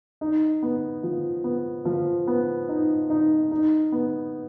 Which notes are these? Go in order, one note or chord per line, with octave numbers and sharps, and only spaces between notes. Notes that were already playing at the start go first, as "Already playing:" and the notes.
D#4
B3
F3
B3
F3
B3
D#4
D#4
D#4
B3